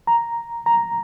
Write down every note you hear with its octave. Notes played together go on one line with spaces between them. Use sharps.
A#5
A#5